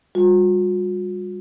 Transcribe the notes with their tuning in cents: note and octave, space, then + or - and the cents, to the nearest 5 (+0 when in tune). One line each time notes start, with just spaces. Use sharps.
G3 +25 F#4 -45